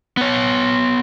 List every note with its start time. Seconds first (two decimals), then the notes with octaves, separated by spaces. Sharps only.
0.17 B3 C#5